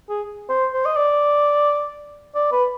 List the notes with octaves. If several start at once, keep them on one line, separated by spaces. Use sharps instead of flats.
G#4
C5
C5
D#5
D5
D5
B4